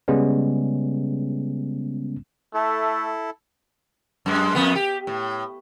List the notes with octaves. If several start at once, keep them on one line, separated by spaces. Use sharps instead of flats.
C#3 G3 G#3 B3 C#4
A3 E4 A4
F#2 G#3
F2 B3
G4
A2